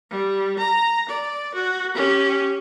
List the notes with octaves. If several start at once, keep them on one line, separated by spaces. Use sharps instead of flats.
G3
A#5
D5
F#4
C#4 G4